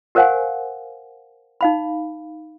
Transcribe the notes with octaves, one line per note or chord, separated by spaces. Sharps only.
G4 A#4 C5 F5 F#5 G#5
D#4 F5 B5